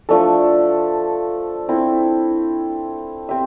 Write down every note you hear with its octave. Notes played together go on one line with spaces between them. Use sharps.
F3 A3 D4 A4
C4 E4 A4
C4 G4 C5 E5